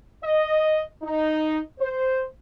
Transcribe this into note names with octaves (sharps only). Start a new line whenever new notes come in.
D#5
D#4
C5